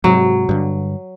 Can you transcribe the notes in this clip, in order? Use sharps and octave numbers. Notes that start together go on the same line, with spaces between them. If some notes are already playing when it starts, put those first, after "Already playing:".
G#2 C3 F#3
G2 D3